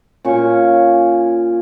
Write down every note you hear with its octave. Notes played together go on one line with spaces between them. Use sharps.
A#2 C#4 F4 C#6